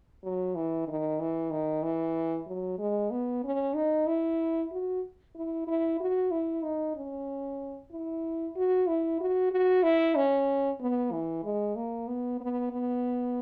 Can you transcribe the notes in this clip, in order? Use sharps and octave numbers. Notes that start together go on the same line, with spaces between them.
F#3
E3
D#3
E3
D#3
E3
F#3
G#3
B3
C#4
D#4
E4
F#4
E4
E4
F#4
E4
D#4
C#4
E4
F#4
E4
F#4
F#4
E4
C#4
B3
E3
G#3
A#3
B3
B3
B3